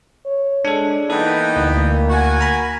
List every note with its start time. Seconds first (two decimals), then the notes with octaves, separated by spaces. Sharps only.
0.25 C#5
0.65 G#3 D4 A4
1.10 E3 A#3 B3 D#4 A4 G5
1.57 D2
2.10 F#4 A#4 G#5
2.41 A#5 B5